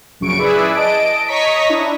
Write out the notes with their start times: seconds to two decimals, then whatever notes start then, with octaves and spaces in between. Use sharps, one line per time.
0.20 A#1 F#2 C#3 C#6 D7
0.39 E4 G#4 B4 D5 E5
0.75 D#5 A5 D7
1.28 C#5 D#5 A#5 C#6 D#6 B6
1.69 D4 E4